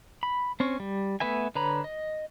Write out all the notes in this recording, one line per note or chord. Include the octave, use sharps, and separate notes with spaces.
B5
C4 C#4 C#6
G3
A3 B3 B4 E5 G#5
D3 B4 C#5 A#5 B5
D#5